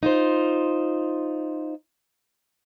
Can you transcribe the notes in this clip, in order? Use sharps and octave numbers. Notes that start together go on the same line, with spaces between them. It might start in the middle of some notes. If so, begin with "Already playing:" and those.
D#4 F4 C5